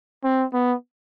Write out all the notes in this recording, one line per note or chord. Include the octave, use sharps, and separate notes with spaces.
C4
B3